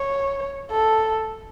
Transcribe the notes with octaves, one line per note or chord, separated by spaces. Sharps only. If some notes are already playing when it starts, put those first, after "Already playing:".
Already playing: C#5
A4